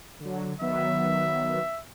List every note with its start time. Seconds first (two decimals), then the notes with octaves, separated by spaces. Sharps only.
0.20 D3 F#3
0.60 D#3 F#3 B3 E5